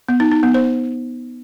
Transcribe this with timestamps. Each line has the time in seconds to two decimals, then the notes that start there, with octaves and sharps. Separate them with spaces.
0.09 B3
0.20 D#4
0.31 D#4
0.43 B3
0.54 C5